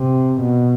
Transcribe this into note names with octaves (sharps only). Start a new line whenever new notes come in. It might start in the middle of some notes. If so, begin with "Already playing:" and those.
Already playing: C3
B2